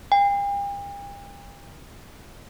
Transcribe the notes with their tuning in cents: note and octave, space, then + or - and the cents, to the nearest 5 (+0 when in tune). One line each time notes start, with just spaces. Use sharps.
G5 +40